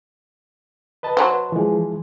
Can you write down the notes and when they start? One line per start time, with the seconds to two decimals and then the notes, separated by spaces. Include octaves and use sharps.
1.03 B4 D#5 A5
1.17 F#3 C5
1.52 E3 F3 G#3